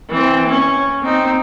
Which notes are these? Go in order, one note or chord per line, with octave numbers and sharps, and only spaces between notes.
E3 C4
C#4
C4 D#4